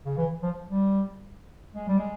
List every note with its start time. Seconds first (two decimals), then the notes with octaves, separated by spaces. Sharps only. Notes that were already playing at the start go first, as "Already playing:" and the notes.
0.05 C#3
0.17 E3
0.43 F3
0.69 G3
1.75 G#3
1.88 G3
1.99 G#3